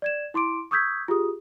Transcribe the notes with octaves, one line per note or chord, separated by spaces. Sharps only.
D5 G#6 E7
E4 C6 D6 D7
C#6 D#6 E6 G6 G#6 B6
F4 G4 G#4 D#6